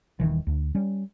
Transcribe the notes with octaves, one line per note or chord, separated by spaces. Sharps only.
D#1 C2 D#3 E3
D2
G3 C#4